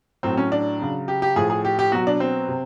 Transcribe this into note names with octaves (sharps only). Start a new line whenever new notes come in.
A2 F#3 C4
C#4
D4
C#3 F#3
G4
G4
A2 F3 G#4
G#4
G4
G4
B2 F#3 F#4
D4
C4
C3